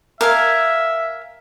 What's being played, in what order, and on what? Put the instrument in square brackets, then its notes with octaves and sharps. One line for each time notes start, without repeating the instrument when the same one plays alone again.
[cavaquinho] A#4 F5 G#5 [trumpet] E5